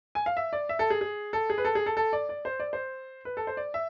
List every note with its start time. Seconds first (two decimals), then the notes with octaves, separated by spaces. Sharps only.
0.15 G#5
0.26 F5
0.37 E5
0.53 D5
0.69 E5
0.79 A4
0.90 G#4
1.01 G#4
1.33 A4
1.50 G#4
1.58 B4
1.65 A4
1.75 G#4
1.86 A4
1.97 A4
2.13 D5
2.29 D5
2.45 C5
2.60 D5
2.73 C5
3.25 B4
3.37 A4
3.47 C5
3.57 D5
3.74 E5